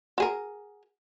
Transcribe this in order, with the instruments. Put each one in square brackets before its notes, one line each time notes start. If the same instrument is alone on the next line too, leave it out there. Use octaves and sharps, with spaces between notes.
[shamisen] F#4 G#4 A#4